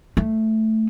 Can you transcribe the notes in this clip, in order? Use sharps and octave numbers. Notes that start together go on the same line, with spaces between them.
A3